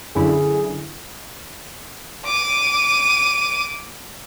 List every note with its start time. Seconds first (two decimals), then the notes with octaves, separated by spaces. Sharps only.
0.15 F#2 D3 E4 G#4
2.25 D6 D#7